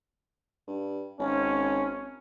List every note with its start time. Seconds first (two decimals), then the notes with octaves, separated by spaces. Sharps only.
0.67 G2
1.19 G#1 C#4